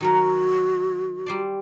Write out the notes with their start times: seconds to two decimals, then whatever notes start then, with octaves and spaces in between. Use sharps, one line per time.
0.01 D#3 F#3 F#4 A#4
1.26 G3 C5 D5